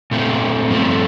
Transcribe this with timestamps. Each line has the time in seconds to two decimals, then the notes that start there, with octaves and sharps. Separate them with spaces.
0.11 A#2 A3 C4
0.70 G2 F3 A3 C4